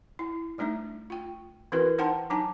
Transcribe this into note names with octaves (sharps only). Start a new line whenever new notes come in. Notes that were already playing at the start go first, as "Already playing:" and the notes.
E4
G3 A3 D4 D#4 E5
F4 G5
E3 C4 E4 F#4 A#4 B4
D#4 C5 F#5 G5 A5 C6
F#3 D4 D#4 G#5 A5